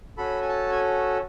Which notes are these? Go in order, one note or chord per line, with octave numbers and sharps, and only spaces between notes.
C#4 F#4 A4 B5
G#5
A5
G#5